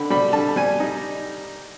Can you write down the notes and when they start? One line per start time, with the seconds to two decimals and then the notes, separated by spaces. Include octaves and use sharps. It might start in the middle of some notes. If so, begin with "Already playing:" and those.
Already playing: D3 B5
0.10 G3 B5
0.33 D3 A5
0.56 G3 G#5
0.80 D#4